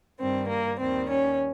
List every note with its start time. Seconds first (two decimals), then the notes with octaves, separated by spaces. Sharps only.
0.19 G2 D#3 G3 C4
0.49 A#3
0.79 D#2 D#3 G3 C4
1.10 C#4